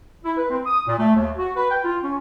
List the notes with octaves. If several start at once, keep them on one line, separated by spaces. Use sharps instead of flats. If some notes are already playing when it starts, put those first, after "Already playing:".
E4
B4
C4
D#6
A#2
A3
D#2
F#4
B4
G5
F4
C#4